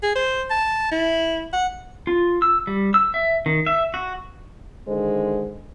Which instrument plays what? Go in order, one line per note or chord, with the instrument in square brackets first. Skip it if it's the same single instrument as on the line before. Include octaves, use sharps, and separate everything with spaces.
[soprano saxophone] G#4
C5
A5
E4
F#5
[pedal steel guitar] F4
E6
G3
E6
E5
D#3
E5
F#4
[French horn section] D3 D#3 G#3 C5